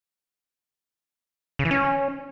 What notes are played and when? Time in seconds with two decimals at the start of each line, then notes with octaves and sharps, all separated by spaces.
1.59 C#3
1.65 E3
1.71 C#4